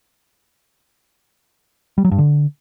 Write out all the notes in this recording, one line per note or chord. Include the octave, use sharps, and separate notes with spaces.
G3
F#3
G2
D3